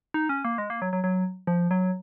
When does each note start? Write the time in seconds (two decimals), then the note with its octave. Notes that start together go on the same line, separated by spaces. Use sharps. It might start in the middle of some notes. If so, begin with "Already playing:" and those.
0.14 D#4
0.29 C#4
0.45 A#3
0.58 G#3
0.70 A#3
0.82 F#3
0.93 F#3
1.04 F#3
1.47 F3
1.71 F#3